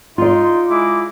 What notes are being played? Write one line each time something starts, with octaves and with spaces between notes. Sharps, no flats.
D#4 F4 D5 C6
G#3 E4 D6